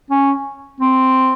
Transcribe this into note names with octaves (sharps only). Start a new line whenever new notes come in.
C#4
C4